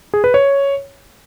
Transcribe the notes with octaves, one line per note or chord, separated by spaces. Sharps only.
G#4
B4
C#5